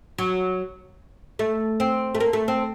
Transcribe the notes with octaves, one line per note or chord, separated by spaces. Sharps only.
F#3
A3
C4
A3
A#3
A3
C4